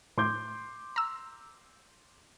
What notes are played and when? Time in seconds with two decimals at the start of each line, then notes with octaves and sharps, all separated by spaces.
0.18 A2 C6 D6 G6
0.96 A#5 E6